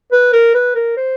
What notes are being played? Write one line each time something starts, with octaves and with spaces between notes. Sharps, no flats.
B4
A#4
B4
A#4
C5